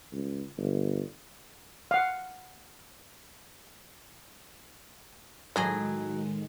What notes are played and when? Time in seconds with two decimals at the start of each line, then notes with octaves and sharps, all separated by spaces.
0.13 C#2
0.57 G1
1.91 F5 F#5
5.56 A2 D#3 F#3 G#3 G#4 D#5